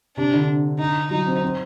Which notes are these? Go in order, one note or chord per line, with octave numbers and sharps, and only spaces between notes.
C3 D4
D3
D#4
F#3 D#4
C4
C4